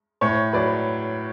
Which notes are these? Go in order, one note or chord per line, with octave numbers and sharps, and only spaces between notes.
A2 C#5
F#3 B4 D5